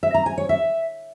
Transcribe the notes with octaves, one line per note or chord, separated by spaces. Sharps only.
E5
A#5
G#5
C#5
E5